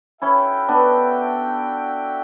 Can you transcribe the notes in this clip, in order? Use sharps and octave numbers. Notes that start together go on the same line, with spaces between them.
C#4 E4 F#4 A4 E5 G5
B3 D4